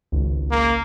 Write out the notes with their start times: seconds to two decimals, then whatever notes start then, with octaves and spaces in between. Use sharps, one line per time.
0.12 G#1 C#2
0.51 A#3